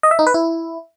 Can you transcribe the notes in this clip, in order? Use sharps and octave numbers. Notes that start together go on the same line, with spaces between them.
D#5
E5
D#4
B4
E4